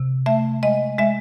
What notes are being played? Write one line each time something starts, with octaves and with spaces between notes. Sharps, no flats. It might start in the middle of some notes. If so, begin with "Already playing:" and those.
Already playing: C3
A3 E5
G#3 D#5
G#3 E5